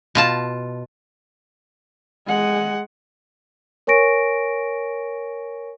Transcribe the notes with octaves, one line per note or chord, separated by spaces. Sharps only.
B2 F4 A5
G#3 F#5
A#4 C#5 G#5 C#6 A#6 D7